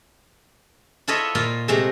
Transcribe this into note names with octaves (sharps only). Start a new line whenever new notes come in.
E4 F4 A4 C#5 D#5 E5
A#2 A#3 F4
C3 G#3 A3 A#5